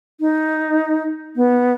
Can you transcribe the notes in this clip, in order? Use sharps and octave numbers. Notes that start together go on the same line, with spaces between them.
D#4
B3